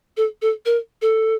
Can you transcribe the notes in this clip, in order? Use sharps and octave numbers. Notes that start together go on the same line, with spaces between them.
A4
A4
A#4
A4